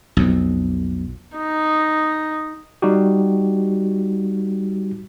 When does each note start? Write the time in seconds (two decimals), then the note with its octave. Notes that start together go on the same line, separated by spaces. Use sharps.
0.17 B1 F2
1.36 D#4
2.82 G3 D#4 F#4 G4